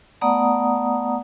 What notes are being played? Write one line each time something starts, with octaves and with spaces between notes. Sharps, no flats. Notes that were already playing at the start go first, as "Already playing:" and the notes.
A3 B3 D5 F#5 A#5 D#6